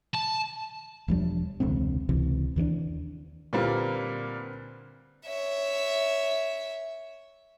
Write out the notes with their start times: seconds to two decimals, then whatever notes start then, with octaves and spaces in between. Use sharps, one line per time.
0.15 A5
1.08 E1 F3 G3 D4
1.60 E1 C#2 D3 C4
2.09 C#2 C3 E3
2.56 D#2 E3 F#3 D4
3.53 A#2 D3 G3 A#3 C4 B4
5.26 C#5 E5